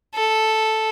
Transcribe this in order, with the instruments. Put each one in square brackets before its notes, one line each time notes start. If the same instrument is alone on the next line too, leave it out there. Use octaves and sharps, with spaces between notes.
[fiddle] A4